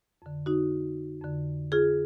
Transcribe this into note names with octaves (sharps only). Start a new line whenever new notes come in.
F2 D3
D#4 F#4
F2 D3
F4 G#4